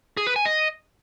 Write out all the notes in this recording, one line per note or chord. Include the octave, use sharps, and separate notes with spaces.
G#4
B4
G#5
D#5